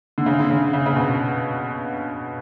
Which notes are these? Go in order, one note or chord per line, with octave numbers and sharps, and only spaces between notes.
D3
C#3
D3
C#3
C#3
C#3
B2